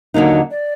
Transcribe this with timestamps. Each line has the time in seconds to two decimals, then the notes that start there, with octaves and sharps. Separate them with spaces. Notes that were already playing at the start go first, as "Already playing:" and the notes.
0.14 D#2 D3 F#3 A#3 D#4
0.51 D5